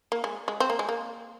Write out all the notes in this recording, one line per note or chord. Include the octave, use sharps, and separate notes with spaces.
A#3
G#3
G#3
C4
A#3
G#3
A#3